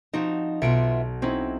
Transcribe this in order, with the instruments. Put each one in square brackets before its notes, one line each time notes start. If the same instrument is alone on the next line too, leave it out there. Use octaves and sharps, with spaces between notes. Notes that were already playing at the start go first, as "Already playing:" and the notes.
[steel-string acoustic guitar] F3 D#4 [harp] C4 F#4
[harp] B1 C#7 D7 [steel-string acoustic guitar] B3 F4 E5
[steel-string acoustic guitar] C4 [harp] C#4 D#4 E4